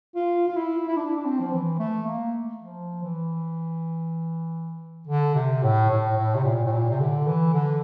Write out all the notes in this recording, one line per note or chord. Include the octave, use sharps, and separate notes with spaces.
F4
F4
E4
E4
D4
D4
C4
F3
E3
A3
A#3
F3
E3
D3
C3
A2
A2
A2
C3
A#2
A2
A#2
C3
D3
E3
D3